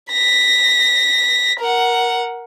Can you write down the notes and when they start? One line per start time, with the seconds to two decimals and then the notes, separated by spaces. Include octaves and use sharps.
0.12 A#6 B6
1.60 A#4 F#5